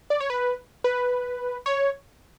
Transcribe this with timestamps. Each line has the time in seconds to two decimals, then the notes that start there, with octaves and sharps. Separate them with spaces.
0.10 D5
0.20 C#5
0.30 B4
0.84 B4
1.66 C#5